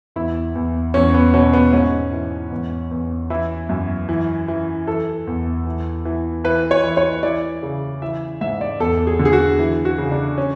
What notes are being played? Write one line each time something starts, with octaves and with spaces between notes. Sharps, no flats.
E2 E4
E2
E2 C#4
B3
B2 C#4
B3
G#2 C#4
E3
E2
E2
E3 E4
F#2
E3
E3
E3 A4
E2
E3
E3
E3 B4
C#5
E3
C#5
E3 D5
C#3
E3 E5
G#2 E5
D5
E2 A4
G#4
D3
G#4
F#4
E3
F#4
C#3
D4
C#4